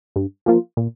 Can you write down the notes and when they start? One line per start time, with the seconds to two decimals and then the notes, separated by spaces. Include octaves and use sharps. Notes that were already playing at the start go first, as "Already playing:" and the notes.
0.16 G2
0.46 F3 A#3 F4
0.77 A#2